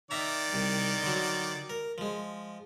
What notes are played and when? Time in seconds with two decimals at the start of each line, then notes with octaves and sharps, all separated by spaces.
0.11 D#3 D5 E5 A#5
0.53 C2
1.02 D3 F#3
1.70 A#4
1.98 F3 G#3